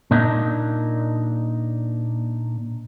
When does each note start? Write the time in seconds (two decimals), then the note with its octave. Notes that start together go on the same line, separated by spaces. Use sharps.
0.11 A#2 D4 D#4